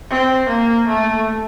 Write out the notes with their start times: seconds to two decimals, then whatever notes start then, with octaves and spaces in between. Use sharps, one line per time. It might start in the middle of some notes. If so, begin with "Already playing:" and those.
0.10 C4
0.49 A#3
0.87 A3